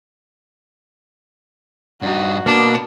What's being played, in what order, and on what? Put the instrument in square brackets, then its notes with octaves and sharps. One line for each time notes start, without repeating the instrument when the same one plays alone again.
[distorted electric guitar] G2 D#4 [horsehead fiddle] F#4
[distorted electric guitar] B2 [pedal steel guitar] A#3 [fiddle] D4